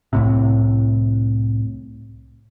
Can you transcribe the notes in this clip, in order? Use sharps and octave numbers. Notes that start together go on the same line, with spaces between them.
C2 A2 C3